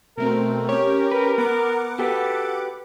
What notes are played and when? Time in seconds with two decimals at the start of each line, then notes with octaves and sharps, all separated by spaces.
0.18 B2 A3 C4 A#4
0.69 C#4 G4 C#5
1.11 B4
1.38 B3 F#5 D6
1.99 F#4 G4 A4 B4